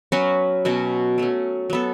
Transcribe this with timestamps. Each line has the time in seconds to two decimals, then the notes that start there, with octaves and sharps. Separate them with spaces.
0.12 F#3 C#4 F#4 B4
0.65 B2 F#3 C#4 F#4
1.18 F#3 A3 C#4
1.70 F#3 B3 A4